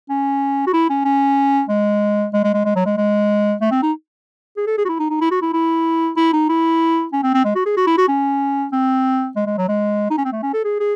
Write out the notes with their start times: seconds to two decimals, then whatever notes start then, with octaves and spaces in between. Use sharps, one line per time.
0.10 C#4
0.67 F#4
0.73 E4
0.90 C#4
1.05 C#4
1.69 G#3
2.33 G#3
2.44 G#3
2.54 G#3
2.65 G#3
2.76 F#3
2.86 G#3
2.97 G#3
3.61 A3
3.71 C4
3.82 D#4
4.57 G#4
4.67 A4
4.78 G#4
4.85 F#4
4.89 E4
4.99 D#4
5.10 D#4
5.21 E4
5.31 F#4
5.42 E4
5.53 E4
6.16 E4
6.33 D#4
6.49 E4
7.13 C#4
7.23 C4
7.34 C4
7.45 G#3
7.55 F#4
7.66 G#4
7.77 F#4
7.87 E4
7.98 F#4
8.08 C#4
8.73 C4
9.36 G#3
9.47 G#3
9.58 F#3
9.69 G#3
10.10 D#4
10.18 C#4
10.25 C4
10.32 A3
10.43 C#4
10.54 A4
10.64 G#4
10.80 G#4